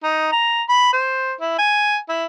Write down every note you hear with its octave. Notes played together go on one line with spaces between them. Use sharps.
D#4
A#5
B5
C5
E4
G#5
E4